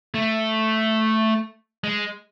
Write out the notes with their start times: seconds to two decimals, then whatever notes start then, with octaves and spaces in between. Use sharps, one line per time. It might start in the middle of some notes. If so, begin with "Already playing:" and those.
0.14 A3
1.84 G#3